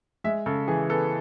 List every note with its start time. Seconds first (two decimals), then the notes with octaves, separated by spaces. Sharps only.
0.24 G#3 E5
0.46 C#3 A4
0.68 E3 G#4
0.89 B3 A4